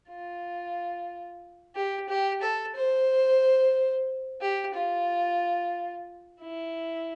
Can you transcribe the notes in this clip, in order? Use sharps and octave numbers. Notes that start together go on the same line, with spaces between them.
F4
G4
G4
A4
C5
G4
F4
E4